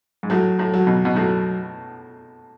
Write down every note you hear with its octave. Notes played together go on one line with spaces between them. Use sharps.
G#2
A2 F#3
A2
F#3
B2
B2
A2 F#3